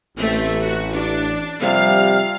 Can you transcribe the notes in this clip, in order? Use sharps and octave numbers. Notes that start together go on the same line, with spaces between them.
A1 A3 C4 E5
F#4
D4
C3 F3 G3 F5